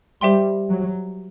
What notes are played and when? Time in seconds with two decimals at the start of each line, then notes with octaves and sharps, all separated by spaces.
0.21 G3 G4 C5 E5 G5 C6
0.69 F#3